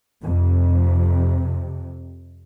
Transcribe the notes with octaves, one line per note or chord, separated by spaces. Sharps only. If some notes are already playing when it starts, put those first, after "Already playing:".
F2 C3